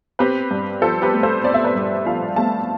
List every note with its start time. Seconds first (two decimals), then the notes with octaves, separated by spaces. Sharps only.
0.19 C4 G4 B4
0.51 G2
0.81 F3 A4 C5
1.02 G4 B4
1.13 A3
1.23 A4 C5
1.44 C4 D5
1.54 E5
1.64 B4 D5
1.75 G2
2.06 F3 F5 A5
2.36 A3 F5 A5